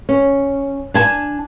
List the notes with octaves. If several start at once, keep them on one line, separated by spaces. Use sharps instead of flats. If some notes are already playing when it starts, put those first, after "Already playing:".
C#4
D4 G#5 A5